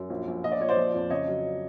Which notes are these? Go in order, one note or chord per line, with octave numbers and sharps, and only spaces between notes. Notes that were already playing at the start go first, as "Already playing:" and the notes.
Already playing: F#2
A#1
A#1
A#2 D#5
D5
A#2 C#5
C5 D5
F3
F2
C#3 C#5 D#5
F#3